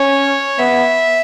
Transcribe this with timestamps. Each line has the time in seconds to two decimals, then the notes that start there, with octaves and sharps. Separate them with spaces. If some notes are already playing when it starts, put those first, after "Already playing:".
Already playing: C#4 C#5
0.58 B3 E5